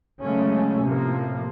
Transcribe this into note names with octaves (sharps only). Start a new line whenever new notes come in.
C#3 F#3 G#3 A3 C#4
A2 C3 F3 A#3